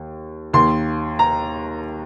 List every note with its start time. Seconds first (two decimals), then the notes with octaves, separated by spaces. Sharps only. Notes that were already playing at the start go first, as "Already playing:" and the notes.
Already playing: D#2
0.54 D#2 D#3 C6
1.19 A#5